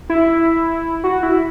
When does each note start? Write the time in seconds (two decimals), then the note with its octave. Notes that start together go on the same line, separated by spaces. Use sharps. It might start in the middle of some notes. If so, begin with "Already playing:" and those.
0.10 E4
1.04 F#4
1.23 E4